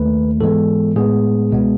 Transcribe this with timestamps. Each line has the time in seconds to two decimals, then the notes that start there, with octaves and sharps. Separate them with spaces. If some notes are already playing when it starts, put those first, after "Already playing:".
Already playing: D#2 D#3 A3 B4
0.41 G#2 E3 G#3 B3 A4
0.96 A2 G#3 B3 G#4
1.51 C#2 B2 G#3 B3